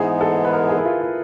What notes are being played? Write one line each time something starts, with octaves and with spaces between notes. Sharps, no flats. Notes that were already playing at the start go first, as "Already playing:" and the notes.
Already playing: G#2 E3 G#3 B3 D#4 G#4
A4
B4
A#4
G#4
E4
F4
E4